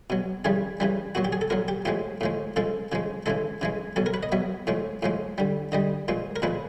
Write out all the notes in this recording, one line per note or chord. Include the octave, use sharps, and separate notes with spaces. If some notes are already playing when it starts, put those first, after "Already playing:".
B2 F#3
C#3 E3 G3 G#4
C#3 E3 G3
A#2 F#3 F#4
G4
G#4
A4
A#2 F#3 A#4
G4
A2 F3 G#3 G4
A2 F3 G#3
C#3 F3 G#3 A4
C#3 F3 G#3
C#3 E3 G#3 A4
C#3 E3 G#3
B2 F#3 A4
A#4
B4
D#5
B2 F#3 E5
A2 F3 G#3
A2 F3 G#3
D3 G3
D3 G3 D#5
A#2 F3 G#3
A#4
A#2 F3 G#3 B4